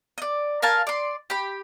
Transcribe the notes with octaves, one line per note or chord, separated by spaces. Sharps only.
D5 D#5
A#4 F5 G#5 A5
D5 C6
G4 B5